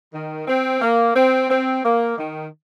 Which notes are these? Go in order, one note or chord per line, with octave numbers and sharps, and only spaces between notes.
D#3
C4
A#3
C4
C4
A#3
D#3